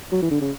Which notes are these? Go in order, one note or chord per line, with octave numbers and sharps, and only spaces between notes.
F#3
E3
D3
C#3